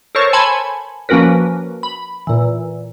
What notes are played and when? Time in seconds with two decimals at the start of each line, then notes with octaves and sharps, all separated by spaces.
0.15 A4 A#4 C5 C#5 C#6
0.33 G#5 A5 B5 C6 G#6 C#7
1.09 F3 A#3 C#4 F#4 A#4 B4
1.83 B5
2.27 A#2 E3